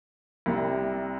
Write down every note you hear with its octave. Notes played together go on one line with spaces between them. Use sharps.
C2 C3 G3